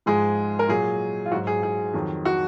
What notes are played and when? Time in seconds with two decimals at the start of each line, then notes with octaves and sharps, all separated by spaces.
0.06 G#2 F3 G#3 G#4
0.59 A#4
0.68 A#2 F#3 G#4
1.26 F4
1.31 F#3 F#4
1.34 G#2
1.47 G#4
1.63 G#4
1.94 F2 D#3 F#3
2.25 F#4